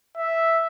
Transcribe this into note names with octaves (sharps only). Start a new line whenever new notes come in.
E5